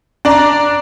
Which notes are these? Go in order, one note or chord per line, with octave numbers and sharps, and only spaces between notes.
D4 D5 A#5